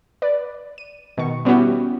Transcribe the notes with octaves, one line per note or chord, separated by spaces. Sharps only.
B4 D5
D#7
B2 D#3 C#6
G3 B3 C#4 E4 F#4 G4